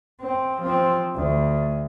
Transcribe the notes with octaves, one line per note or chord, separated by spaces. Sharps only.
C4
F3 C4
D2